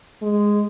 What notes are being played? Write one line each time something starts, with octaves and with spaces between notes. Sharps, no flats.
G#3